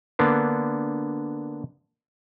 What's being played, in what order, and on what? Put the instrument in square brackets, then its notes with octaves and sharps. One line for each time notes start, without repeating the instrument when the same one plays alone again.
[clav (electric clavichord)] D3 A#3 B3 D4